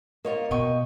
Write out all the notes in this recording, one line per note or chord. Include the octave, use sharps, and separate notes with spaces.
A#3 F4 C#5 D#5
B2 D#5 G5 C#6